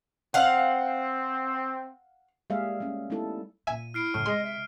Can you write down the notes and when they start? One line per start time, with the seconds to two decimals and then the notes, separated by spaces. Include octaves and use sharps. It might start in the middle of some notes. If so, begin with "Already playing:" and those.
0.34 C4 F5 F#5
2.50 G3 G#3 A#3 G#4 E5 F5
2.80 G3 A3 C#4
3.10 G3 A3 B3 D#4 E4 A4
3.67 A#2 A#3 E5 G#5 D#7
3.94 E4 F6 C7 D7
4.14 F#2 A2 C#3 F6
4.26 C3 G#3 D#5 C6
4.44 E5